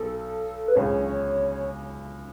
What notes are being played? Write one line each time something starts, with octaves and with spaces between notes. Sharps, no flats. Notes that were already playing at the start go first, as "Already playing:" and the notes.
Already playing: B1 A4
B4
C#2 C#3 C#5